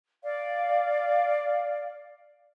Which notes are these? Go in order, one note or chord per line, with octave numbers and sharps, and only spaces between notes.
D5 F5